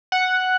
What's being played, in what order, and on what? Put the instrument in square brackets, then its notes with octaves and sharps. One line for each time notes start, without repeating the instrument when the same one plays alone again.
[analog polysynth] F#5